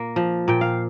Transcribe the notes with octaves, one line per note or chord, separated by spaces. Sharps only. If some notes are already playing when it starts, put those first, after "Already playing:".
Already playing: A#2 A#3
F3
A#2 G5
F5